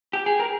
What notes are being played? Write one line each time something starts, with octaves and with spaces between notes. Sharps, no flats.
G4
G#4
A#4